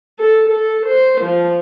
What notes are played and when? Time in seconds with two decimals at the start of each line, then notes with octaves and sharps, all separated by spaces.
0.18 A4
0.48 A4
0.86 C5
1.21 F3